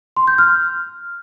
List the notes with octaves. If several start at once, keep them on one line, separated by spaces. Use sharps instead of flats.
C6
G6
F6